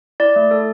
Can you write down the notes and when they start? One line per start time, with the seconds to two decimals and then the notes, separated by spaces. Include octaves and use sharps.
0.20 E4 D5
0.36 A3
0.51 A4